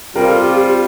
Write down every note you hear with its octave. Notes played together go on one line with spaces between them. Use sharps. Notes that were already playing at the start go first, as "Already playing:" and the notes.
G3 C4 F4 A#4
A4
G4
G4